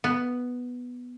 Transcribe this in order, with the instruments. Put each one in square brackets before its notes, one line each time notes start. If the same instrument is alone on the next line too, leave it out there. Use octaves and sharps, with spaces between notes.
[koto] B3